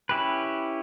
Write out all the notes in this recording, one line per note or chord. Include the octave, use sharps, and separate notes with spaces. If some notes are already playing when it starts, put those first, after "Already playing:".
C#4 E4 G4 B4